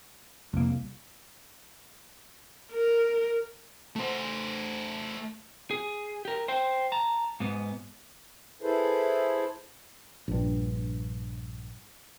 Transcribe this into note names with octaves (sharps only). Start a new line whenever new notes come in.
C2 F2 A#3
A#4
A3 C5
G#4
G4 A#4
C5 G5
A5 A#5
G#2 B3
E4 G#4 A4 B4 C5
A#1 G2